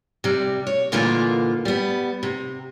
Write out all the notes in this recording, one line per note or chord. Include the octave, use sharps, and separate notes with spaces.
C3 G3
C#5
A#2 D3 E3 G#3 A#3 F4
G3 B3
C3